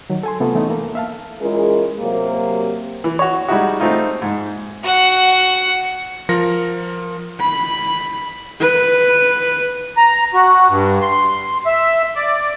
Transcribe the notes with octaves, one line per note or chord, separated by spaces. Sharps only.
D#3 F#3
A4 G#5 C6
C3 A3 B3 F4 A4
E3 A3 B3 C#4 D#4
A#3 A4
E5 F5 A5
E3 G#3 C#4 F4 G#4 A#4
C3 F#3 A#3
E3
F#4 C#5
G3 G#3 D#4 E4 F#4
A3 C4 D#4 F4
G#2
F#4 F#5
F3 A#4 A#6 C#7
B5
B4
A#5
F#4
G2
C6
E5
D5